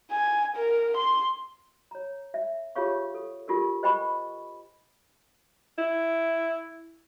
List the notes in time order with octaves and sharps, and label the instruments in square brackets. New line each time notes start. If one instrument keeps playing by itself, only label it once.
[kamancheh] G#5
A#4
C6
[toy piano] C#5 A#5
E5
F4 G4 G#4 C#5 F5 C#6
A4
F4 G4 A4 A#4
C5 D#5 G5 G#5 B5 C#6
[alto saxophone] E4